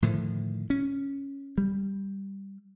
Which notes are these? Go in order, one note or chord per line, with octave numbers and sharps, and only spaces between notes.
A2 D3 D#3 F3
C#4
G3